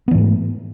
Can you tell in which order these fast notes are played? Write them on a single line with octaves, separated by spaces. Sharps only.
B3 E3 G#2 A3